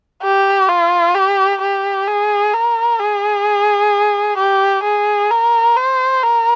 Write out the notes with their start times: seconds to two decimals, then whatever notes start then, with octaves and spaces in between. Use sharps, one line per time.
0.23 G4
0.69 F4
1.15 G4
1.62 G4
2.08 G#4
2.54 A#4
3.00 G#4
4.38 G4
4.84 G#4
5.31 A#4
5.77 C5
6.23 A#4